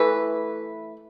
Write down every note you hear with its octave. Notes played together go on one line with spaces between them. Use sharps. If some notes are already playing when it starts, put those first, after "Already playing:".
Already playing: E3 A3 A4 B4